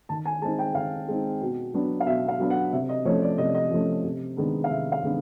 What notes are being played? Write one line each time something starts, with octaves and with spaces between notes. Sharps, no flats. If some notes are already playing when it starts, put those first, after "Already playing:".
D#3 A5
G#5
G#3 C4 D#4 A5
G5
D#3 F5
G#3 C4 D#4
B2
F#3 B3 D4
F5
B2 E5
F5
F#3 B3 D4
F#5
C3 E5
D#5
F3 A3 C#4 C#5
D5
C3 D#5
D5
D#5
F3 A3 C#4
C3
D#3 G#3 B3 D4
F5
C3 E5
F5
D#3 G#3 B3 D4